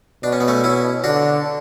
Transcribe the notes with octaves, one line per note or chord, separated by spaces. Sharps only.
B2 D4
C#4
B3
A3 C#4
C#4 E4
D3 D4 F#4